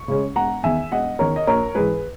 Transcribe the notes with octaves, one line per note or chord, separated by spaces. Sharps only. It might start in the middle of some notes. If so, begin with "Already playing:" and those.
Already playing: C#6
C#3 G#3 C#4
E1 F#5 A#5
E2 D#3 E5 G#5
E1 D#5 F#5
E2 D#3 A#4 C#5
D#5
A#1 A#4 C#5
G#2 E3 G#4 B4